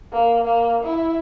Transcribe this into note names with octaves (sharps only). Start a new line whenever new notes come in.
A#3
A#3
E4